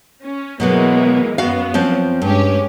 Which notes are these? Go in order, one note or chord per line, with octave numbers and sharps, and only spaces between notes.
C#4
B2 E3 F#3 G#3 A#3 B3
F#2 B3 F#4 F5
F3 C4 C#4
G2 G#3 C#4 G4